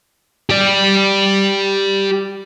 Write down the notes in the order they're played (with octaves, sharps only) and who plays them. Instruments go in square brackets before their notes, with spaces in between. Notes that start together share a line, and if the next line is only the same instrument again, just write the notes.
[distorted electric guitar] G4 D5